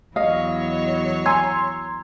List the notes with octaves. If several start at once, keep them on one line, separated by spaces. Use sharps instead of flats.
E2 F#3 C#5 D#5 F5
G#5 A#5 C6 E6 G#6